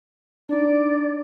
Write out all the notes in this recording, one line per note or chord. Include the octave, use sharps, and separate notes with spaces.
D4 D#4 D5